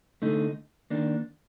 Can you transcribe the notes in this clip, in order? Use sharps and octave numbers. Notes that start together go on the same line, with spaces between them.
D3 A3 D#4
D#3 A#3 D4